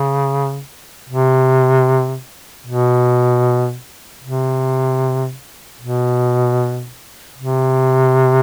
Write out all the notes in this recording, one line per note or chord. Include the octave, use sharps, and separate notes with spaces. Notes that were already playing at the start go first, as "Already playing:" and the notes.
Already playing: C#3
C3
B2
C3
B2
C3